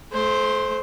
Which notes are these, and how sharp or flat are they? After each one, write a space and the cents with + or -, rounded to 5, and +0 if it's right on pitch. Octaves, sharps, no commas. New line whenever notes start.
A3 -35 C5 +0